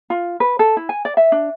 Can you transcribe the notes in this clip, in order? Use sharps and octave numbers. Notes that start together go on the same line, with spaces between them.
F4
B4
A4
E4
G#5
D5
E5
D4